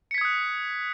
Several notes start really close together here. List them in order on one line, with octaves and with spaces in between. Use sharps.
C#7 B6 G#6 D#6 F#6